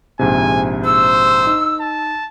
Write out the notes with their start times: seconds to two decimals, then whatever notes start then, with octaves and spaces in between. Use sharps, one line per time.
0.19 A#1 G#2 C3 G#5
0.85 C5 E6
1.47 D#4
1.80 A5